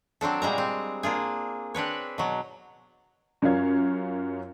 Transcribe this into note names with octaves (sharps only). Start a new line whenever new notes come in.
F#3 C4 D4 A4
A#2 G3 G#3 A#5
C4
A#3 D4 F4 G#4
C4 D4 B4 C#5
B2 F#3
F#2 C#4 F4 A#4 F5 G#6